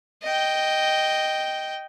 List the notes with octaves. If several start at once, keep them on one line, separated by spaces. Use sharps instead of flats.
D#5 G5